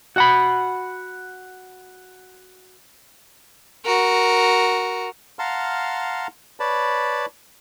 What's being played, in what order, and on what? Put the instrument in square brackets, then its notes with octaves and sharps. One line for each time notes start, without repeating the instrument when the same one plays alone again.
[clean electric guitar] F#4 F#5 B5
[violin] F#4 A#4
[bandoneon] F5 F#5 A5 A#5 C6 F6
B4 C#5 D5 A5 B5